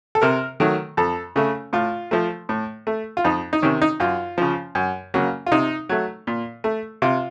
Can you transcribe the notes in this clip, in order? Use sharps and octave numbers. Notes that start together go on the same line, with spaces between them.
A4
C3 A#4
D#3 F#3 A3
F2 A4
C#3 A3
A2 F4
F3 A3
A2
A3
F4
F2 D#4
D#4
C3 D#3 C#4
D#4
F#2 F4
C#3 F3
F#2
C#3 F#3 A#3
F4
C3 D#4
F#3 A3
A#2
A3
C3 F4